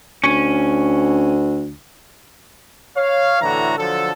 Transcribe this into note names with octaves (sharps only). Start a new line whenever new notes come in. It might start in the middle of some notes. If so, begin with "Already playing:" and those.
D2 C#4
C#5 F5
A2 D3 E3 F#4 A#5
D3 F3 F#3 A4